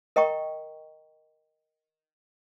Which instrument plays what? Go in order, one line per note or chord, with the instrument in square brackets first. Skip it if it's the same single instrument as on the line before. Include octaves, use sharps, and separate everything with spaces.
[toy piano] A#4 D#5 G5 A#5 C#6